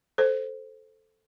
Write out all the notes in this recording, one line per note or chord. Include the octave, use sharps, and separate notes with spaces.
A4 C5